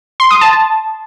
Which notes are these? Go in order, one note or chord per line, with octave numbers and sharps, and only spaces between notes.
C6
D#6
A5